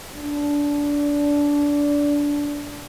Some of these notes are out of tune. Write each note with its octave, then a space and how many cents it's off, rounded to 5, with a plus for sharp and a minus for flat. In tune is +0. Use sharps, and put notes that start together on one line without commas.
D4 -20